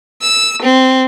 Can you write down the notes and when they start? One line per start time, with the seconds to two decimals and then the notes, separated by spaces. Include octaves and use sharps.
0.21 E6
0.62 C4